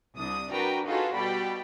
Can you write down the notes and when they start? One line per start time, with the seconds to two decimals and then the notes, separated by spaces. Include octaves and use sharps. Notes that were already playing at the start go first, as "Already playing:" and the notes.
0.16 C2 D4 D#6
0.51 D4 F#4 A#4 B4 G5 A#5
0.86 D#4 F4 F#4 G#4 A4 B4
1.15 B2 G3 D5 G5 B5